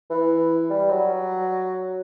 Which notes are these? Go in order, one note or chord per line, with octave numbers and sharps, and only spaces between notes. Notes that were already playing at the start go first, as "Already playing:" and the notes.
E3
G3
F#3